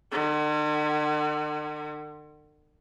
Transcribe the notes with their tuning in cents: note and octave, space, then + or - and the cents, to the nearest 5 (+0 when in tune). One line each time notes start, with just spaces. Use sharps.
D3 +45